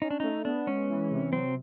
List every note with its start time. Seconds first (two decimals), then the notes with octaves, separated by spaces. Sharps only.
0.01 C#4 D#4
0.11 D4
0.20 A3 D#4
0.45 B3 D4
0.67 G#3 C#4
0.89 E3
1.11 C3
1.33 F#3 C4